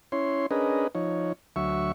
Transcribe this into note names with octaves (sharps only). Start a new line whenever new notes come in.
C#4 E4 C#5 C6
C#4 D4 G#4 A#4 B4 D#5
F3 D#4 C#5
D2 F#3 E5 C#6